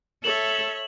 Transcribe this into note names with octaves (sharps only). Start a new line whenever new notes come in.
A4 C#5 E5 E7 F#7